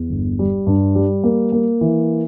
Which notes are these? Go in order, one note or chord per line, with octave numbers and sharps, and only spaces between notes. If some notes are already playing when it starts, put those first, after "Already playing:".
Already playing: E2
G1
G3
G2
G3
A#3
A#3
E3